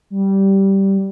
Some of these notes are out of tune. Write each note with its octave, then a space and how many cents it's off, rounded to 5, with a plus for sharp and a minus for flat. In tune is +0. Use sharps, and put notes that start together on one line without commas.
G3 -10